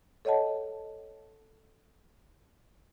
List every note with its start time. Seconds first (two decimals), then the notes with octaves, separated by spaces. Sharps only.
0.25 A4 C#5 D#5 F#5 A5